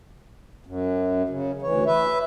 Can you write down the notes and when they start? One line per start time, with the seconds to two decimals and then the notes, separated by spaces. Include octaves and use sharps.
0.66 F#2
1.29 C#3
1.62 D2 E3 C#5
1.86 B4 E5